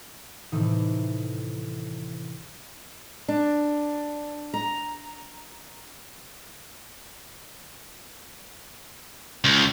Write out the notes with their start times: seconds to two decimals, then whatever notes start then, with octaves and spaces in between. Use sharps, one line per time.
0.52 A2 C3 D#3 E3 A3 D#4
3.28 D4
4.54 A#5
9.44 C#2